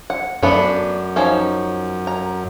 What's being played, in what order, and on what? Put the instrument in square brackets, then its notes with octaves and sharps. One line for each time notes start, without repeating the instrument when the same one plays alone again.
[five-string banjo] F#5
[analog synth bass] F#2 [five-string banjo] A3 B3 D4
[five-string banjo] F3 C#4 D#4
A#5